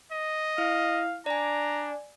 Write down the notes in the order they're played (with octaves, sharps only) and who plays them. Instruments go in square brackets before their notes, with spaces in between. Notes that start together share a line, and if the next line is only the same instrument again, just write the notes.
[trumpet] D#5
[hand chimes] E4 [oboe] F5
[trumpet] D4 [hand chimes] D5 G#5 [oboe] A#5